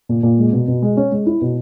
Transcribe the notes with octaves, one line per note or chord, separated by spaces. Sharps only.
A#2
A#2
G#3
B2
B2
G#3
C#4
G#3
E4
B2